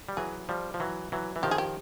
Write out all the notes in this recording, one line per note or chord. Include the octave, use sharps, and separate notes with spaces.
G3
E3 F#3 G#4
F3 G3
F3
E3 F#3
E3 F#3
E3
D#3 F3 G4
G#4
G4